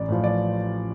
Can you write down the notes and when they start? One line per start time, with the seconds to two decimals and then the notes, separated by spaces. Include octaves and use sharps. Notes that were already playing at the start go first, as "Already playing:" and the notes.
Already playing: A1 D5
0.09 A2 F3
0.24 D5